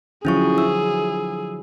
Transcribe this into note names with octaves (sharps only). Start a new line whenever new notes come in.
D3 F3 F#3 C#4 E4 G#4 C#6
E4 E6